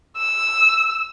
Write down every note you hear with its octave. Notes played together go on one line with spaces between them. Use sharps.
E6